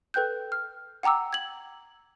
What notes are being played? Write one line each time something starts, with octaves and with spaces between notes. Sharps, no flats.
A4 B4 G5 F#6 G6
F6
F#5 G5 A#5 D6 E6
G#6 F#7